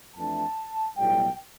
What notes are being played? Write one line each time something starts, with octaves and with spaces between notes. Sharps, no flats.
F2 E3 A3 D4 A5
B1 A2 G3 G5